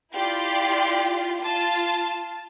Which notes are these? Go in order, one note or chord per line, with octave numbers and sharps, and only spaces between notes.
E4 F4 G4 D5 C6
F4 A5